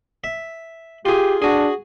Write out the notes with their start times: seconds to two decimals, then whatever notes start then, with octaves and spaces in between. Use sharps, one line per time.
0.24 E5
1.05 F4 G4 G#4
1.42 D4 F#4 G#4